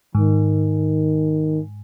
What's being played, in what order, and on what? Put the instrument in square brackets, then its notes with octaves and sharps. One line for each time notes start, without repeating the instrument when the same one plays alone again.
[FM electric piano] G#2 [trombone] D#3